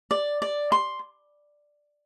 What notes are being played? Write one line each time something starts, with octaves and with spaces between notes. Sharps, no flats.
D5
D5
C6